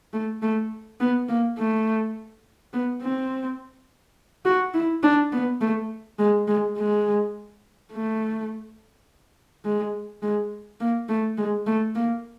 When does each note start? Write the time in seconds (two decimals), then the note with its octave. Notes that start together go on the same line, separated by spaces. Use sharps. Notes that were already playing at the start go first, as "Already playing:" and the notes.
0.13 A3
0.42 A3
1.00 B3
1.28 A#3
1.58 A3
2.73 B3
3.02 C4
4.45 F#4
4.74 E4
5.03 D4
5.33 B3
5.61 A3
6.19 G#3
6.48 G#3
6.77 G#3
7.92 A3
9.65 G#3
10.22 G#3
10.80 A#3
11.09 A3
11.37 G#3
11.66 A3
11.95 A#3